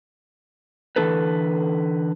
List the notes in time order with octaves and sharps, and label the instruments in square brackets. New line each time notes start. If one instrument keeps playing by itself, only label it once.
[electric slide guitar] D3 E3 D#4 A4 B4